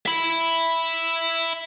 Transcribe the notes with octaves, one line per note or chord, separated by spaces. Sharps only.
E5 B5